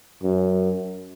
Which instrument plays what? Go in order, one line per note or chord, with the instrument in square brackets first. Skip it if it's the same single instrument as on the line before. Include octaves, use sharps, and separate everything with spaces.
[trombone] F#2